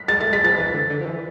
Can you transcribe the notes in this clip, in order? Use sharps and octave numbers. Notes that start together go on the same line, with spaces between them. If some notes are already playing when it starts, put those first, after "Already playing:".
Already playing: B6
G#3 A6
A3 A6
G#3 B6
F3 A6
E3
D3
D3
F3
E3